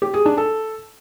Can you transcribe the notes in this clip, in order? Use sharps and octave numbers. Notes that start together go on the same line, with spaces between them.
G4
G#4
D4
A4